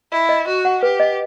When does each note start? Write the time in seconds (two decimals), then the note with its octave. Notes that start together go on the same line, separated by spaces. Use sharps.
0.12 E4 D#5
0.29 D#5
0.47 F#4 D#5
0.65 F#5
0.83 G4 B4
1.00 D#5